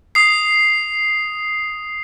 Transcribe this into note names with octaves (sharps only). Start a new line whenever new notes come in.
D#6 C7